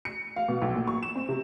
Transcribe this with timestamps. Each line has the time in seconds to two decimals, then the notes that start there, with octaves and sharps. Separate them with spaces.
0.05 C#7
0.36 F5
0.48 B2
0.62 B1
0.75 A#2
0.87 C#6
1.03 E7
1.15 C4
1.29 C3